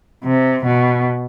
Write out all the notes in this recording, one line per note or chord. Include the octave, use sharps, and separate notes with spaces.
C3
B2